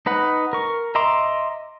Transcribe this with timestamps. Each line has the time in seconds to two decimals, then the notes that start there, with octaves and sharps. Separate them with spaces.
0.06 D#4 B4 F#5
0.53 A#4 C#6
0.95 D#5 E5 A#5 C6 D6